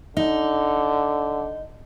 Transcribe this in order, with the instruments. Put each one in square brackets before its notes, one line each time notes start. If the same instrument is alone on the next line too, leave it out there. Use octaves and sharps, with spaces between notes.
[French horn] D3 [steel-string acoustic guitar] D#4